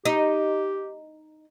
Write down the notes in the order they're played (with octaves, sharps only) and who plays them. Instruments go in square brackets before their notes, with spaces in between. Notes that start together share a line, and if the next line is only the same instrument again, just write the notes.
[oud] D#4 [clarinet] G4